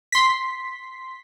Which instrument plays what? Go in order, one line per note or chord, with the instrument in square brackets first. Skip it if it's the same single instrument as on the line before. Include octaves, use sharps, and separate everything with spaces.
[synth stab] C6 B6